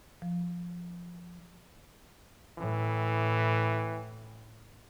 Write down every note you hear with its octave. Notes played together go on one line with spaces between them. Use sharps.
F3
A2 E3